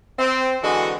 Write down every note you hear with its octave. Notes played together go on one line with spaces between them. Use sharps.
C4
D3 E3 G#3 F#4